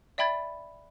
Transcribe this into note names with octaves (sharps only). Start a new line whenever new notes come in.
D5 E5 G5 B5 G#6 A6